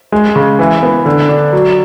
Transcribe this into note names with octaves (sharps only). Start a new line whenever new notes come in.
G#3
C#3
E3
B3
D3
D4
F#3